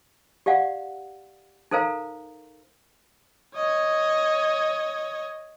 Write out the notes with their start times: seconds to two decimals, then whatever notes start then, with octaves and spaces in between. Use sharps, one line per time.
0.46 G4 D5 F5 F#5
1.71 D#4 A4 A#4 C5 F5 A#5
3.55 C#5 D#5